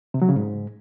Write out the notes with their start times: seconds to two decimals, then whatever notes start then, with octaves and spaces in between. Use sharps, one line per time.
0.14 C3
0.22 F#3
0.29 C#3
0.36 G#2